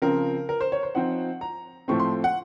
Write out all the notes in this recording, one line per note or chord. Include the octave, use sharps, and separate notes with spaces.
C#3 F3 C4 A#4
A#4
C5
C#5
C5
F3 C4 D#4 F#5
A#5
A2 F3 A3 C4 C#6
C6
F#5